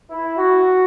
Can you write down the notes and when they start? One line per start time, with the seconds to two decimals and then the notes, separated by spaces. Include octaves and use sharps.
0.10 E4
0.37 F#4